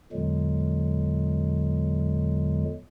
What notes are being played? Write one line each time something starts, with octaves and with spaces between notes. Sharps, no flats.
E2 A#2 D3 F#3 G#3